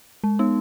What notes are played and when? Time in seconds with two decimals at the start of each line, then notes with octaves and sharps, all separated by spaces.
0.24 G#3
0.39 B3 D#4